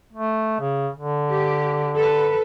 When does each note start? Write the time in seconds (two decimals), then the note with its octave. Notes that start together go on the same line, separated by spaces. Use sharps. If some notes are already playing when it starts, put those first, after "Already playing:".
0.13 A3
0.60 C#3
0.95 D3
1.30 G4
1.96 A4 B4